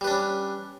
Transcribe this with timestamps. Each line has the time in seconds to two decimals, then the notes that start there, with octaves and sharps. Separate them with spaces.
0.01 G3
0.04 B4
0.07 D4
0.10 C#4